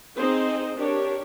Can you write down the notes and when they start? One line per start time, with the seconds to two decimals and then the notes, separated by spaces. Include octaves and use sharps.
0.18 C4 D#4 G#4 C5 D#5
0.77 D4 G4 A#4 C#5